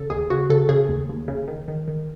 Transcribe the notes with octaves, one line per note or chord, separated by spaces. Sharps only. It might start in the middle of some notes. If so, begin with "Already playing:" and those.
Already playing: C#3 A4
D#2 G#4
C#3 F#4
C#3 A4
C#3 G#4
D#2
D#2
C#3
D#3
D#3
D#3